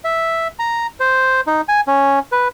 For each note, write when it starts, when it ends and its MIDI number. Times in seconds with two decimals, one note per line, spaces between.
0.04 0.48 76
0.59 0.87 82
1.00 1.41 72
1.47 1.61 63
1.69 1.81 80
1.87 2.19 61
2.32 2.48 71